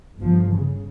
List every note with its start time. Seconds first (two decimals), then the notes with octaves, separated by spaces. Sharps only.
0.18 G1 F3
0.52 C#3